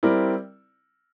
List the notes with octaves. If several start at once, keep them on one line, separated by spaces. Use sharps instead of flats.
G3 C4 E4 A#4 D5